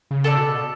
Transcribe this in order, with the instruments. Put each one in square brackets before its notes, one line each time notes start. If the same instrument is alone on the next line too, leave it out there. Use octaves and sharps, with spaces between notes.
[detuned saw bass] C#3
[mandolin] A4 D5
[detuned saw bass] B2